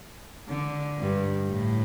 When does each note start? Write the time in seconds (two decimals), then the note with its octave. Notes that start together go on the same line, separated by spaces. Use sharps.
0.47 D3
0.98 G2
1.48 A2